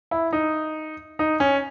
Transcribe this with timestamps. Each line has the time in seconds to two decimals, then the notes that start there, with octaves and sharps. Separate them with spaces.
0.11 E4
0.33 D#4
1.19 D#4
1.40 C#4